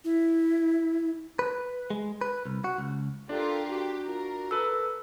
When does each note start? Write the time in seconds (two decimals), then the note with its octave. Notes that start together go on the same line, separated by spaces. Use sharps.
0.04 E4
1.39 B4
1.90 G#3
2.21 B4
2.45 C2
2.64 F#4
2.78 C#2
3.29 D4 F4 G4 A4 A#4
3.69 F#4 G4
4.08 F4 A#4
4.51 A4 B4 E6